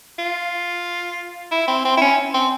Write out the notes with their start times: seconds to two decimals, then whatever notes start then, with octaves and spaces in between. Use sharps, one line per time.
0.19 F4
1.51 E4
1.68 C4
1.85 C4
1.97 E4
2.01 C#4
2.34 C4